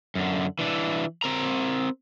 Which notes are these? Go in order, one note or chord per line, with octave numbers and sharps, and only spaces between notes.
F#2 D3
E3 D4
C4 A#4 A#5